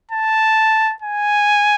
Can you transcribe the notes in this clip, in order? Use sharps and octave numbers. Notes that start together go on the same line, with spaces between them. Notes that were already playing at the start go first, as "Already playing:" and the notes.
A5
G#5